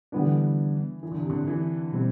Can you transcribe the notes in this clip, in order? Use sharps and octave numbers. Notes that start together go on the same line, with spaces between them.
D3 E3 G3 B3 D4
E3
D3
C3
D3
E3
B2 G3 C4